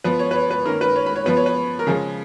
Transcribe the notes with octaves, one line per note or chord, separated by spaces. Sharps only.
F3 B3 B4
C#5
B4
C#5
B4
D#3 A#3 C#4 A#4
B4
C#5
B5
C#5
F3 B3 B4
C#5
B4
A#4
C#3 F3 G#3 C#4 G#4